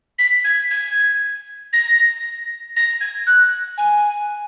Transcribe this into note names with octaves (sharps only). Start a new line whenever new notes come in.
B6
G#6
G#6
A#6
A#6
G#6
F#6
G#5